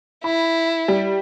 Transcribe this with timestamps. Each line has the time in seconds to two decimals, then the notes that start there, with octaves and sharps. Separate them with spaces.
0.24 E4 B5
0.88 G3